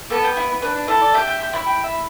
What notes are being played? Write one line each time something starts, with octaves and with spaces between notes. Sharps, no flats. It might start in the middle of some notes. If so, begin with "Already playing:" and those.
B3 A4
G4
E4
B3
D4 B4
D4
E4 A4
D5
G4 E5
G4
G4
E4
G5
E5